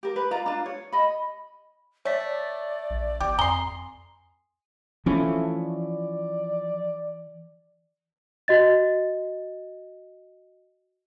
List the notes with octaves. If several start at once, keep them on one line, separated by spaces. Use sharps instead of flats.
G4 A#4
B4
F4 D5 A#5
D4 F4
C#5
D#5 B5
A3 C#5 D5 B6
A#1
G1 G4
F2 G#5 A#5 C6 D#6 G7
E3 F3 A3 C#4
D5
F#4 D#5 A6